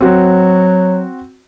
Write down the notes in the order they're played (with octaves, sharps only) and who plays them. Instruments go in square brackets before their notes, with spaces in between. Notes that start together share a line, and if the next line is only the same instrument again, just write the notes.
[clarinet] F#3 [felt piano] C4 F#4